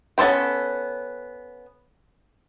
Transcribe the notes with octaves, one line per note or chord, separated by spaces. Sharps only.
B3 C#4 A4 C5 G5